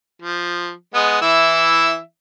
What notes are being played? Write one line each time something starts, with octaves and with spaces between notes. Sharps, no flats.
F3
G#3 B3 D#6
E3 E4 E5